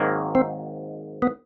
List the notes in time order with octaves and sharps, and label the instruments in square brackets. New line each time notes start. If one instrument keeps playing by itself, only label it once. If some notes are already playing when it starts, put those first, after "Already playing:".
Already playing: [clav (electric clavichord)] G#1 G#2 D#3 F#3 A#3
[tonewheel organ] C4
B3